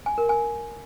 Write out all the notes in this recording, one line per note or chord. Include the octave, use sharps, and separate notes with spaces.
G#5
A#4
G#5